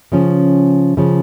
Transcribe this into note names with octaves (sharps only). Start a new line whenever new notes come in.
C#3 F3 C#4
C#3 F3 C#4